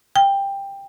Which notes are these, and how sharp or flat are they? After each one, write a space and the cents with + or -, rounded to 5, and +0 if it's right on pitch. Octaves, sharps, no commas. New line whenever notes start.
G5 +15